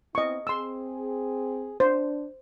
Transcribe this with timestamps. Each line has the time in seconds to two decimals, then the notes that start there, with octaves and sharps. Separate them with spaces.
0.15 B3 C4 E4 D#5 C#6
0.47 C4 G#4 C6 E6
1.80 D4 C5